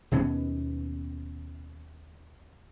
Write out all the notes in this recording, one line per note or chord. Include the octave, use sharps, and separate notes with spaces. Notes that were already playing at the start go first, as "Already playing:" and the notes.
D#2 B2 B3 C#4